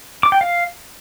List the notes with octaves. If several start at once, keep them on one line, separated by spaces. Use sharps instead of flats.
D6
G5
F5